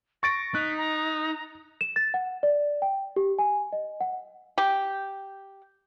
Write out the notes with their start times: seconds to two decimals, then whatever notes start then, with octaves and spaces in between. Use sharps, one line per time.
0.23 C#6 A6 A#6 D7
0.55 D#4 F#6 B6
0.78 A#5
1.81 E7
1.96 A6
2.14 F#5
2.43 D5
2.82 G5
3.16 G4
3.39 G#5
3.72 D#5
4.01 F#5
4.58 G4